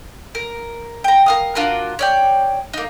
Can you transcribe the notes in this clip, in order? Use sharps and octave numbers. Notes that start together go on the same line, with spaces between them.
A#4
G5 A#5
A#4 F5 D#6
D4 F4 F#4 A#4
C#5 D5 G5
A#3 D#4